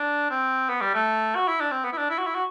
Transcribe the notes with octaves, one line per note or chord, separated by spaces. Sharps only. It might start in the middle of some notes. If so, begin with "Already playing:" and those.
Already playing: D4
C4
B3
G3
A3
F#4
E4
D4
C4
B3
E4
D4
E4
F#4
E4
F#4